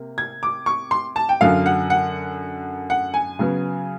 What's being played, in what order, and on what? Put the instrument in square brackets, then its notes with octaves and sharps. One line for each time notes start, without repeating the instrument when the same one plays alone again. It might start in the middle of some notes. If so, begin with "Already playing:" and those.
Already playing: [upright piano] C3 A#3
G#6
D6
C#6
C6
A5
G5
F#2 D3 F#3 F5
F#5
F#5
F#5
G#5
C#3 F#3 B3